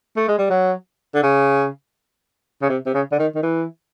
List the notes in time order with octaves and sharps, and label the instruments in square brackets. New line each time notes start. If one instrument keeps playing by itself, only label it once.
[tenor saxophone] A3
G#3
G3
F#3
D3
C#3
C#3
C3
C3
C#3
D3
D#3
D#3
E3